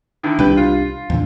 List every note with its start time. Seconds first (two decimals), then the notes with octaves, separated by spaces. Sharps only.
0.23 D3 D#3 E4
0.39 C2 G3 D4 B4 G5
0.57 F4
1.10 E2 A#2 D3